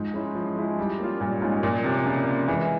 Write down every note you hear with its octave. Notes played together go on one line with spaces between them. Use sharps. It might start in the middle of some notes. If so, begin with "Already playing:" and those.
Already playing: G#2 F3
G#3 C#4 E4
F3
G#3 C#4 E4
G3
A#3 C#4 F4
A#2 G3
G#2 A#3 C#4 F4
A#2 F3
C3 A#3 C#4
C#3 F3
A#3 C#4
E3 G#3